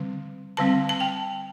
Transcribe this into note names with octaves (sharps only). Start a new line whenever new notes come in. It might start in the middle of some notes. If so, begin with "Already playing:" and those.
Already playing: D3 G3 C4
D3 G3 C4 A5
A5
G5